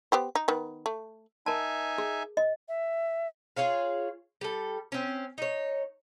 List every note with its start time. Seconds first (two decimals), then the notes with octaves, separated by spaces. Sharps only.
0.12 B3 G4 C5
0.35 D#4
0.48 D#3 B3
0.86 A3
1.46 D#4 A#4 E5 G#5 A5
1.98 G#4
2.37 D#5
2.68 E5
3.56 F4 G#4 C#5 F5
4.41 G3 A4
4.92 C4 C#4
5.38 D#4 C#5